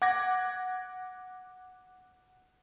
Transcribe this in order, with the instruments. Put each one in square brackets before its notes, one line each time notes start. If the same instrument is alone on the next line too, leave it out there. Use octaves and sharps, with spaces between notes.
[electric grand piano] F#5 D6 G#6 A#6